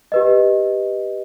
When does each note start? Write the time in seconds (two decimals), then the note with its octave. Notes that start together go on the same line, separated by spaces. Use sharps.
0.12 G4 B4 D#5